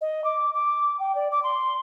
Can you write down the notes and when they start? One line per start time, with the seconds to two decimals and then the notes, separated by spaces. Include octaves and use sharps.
0.01 D#5
0.24 D6
0.54 D6
0.99 G5
1.15 D5
1.31 D6
1.43 C6